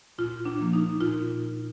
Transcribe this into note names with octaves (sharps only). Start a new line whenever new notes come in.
A#2 F4
D4
F3 A#3
D#4
A#2 F4